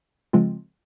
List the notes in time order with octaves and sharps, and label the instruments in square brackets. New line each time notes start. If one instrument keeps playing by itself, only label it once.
[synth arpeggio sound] C#3 F3 G#3 C4 F4